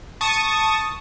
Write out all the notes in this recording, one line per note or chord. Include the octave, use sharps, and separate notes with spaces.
A5 C#6 D#6